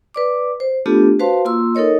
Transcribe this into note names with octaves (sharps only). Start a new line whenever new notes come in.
B4 D5 D6
C5
A3 B3 D4 F4 G4 A4
F#4 B4 C5 F5 A5 C6
A#3 F4 C6 E6
D#4 A4 A#4 C#5 D#5